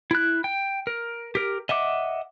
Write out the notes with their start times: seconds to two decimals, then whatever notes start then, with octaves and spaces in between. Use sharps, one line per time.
0.11 E4 F#6
0.44 G5
0.87 A#4
1.35 G4 A#4
1.69 D#5 E5 F#5 D6